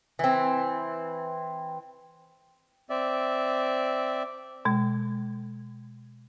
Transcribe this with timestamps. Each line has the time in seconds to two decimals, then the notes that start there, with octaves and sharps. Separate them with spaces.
0.19 E3 C4
2.90 C4 D5 E5
4.65 B2 G#3